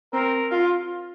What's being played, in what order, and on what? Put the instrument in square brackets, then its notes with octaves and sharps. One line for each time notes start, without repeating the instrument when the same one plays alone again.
[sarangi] C4 [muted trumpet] A#4
[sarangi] F4